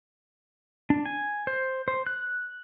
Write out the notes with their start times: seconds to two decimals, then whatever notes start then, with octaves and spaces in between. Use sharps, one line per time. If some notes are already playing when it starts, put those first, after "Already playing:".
0.90 D4
1.06 G#5
1.47 C5
1.88 C5
2.07 F#6